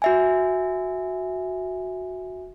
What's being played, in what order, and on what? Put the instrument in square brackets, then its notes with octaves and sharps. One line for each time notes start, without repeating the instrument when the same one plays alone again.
[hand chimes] F#4 E5 G#5